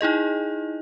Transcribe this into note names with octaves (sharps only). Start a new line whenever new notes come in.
D#4 E4 G#4 D#5